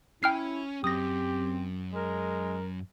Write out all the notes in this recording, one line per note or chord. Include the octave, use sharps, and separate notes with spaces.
C#4 E4 G5 F6 C7
F#2 C4 G4 D#6 A#6
G#3 A#4